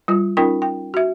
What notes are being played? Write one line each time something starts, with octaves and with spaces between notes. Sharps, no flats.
G3 F4
C#4 D#4 F4 A#4 G5
G5
F#4 E5